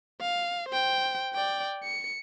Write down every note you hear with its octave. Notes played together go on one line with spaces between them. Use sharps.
F5
C5 G5
D5 G5
C#7